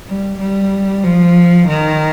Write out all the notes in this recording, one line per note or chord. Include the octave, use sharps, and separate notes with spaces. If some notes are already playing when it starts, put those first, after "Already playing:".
G3
G3
F3
D#3